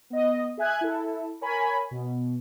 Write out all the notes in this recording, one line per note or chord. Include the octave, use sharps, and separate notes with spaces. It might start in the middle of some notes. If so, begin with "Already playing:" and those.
B3 D#5
G#4 E5 G#5 F#6 G#6
E4 A4
A#4 C#5 G#5 B5
B2